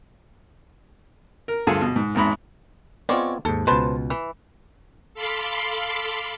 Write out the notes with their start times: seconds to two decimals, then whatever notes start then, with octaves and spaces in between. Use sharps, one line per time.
1.48 A#4
1.67 D2 G2 F4 G#4 A4 G#5
1.81 B2
1.96 G#2
2.15 G#1 E2 G#2 A#5 B5
3.09 G#3 B3 C4 F4 C#5 D5
3.45 D#2 G#2 A4
3.67 C#2 B2 B4 C5 A5
4.10 E3
5.14 A4 F5 B5 C6 D6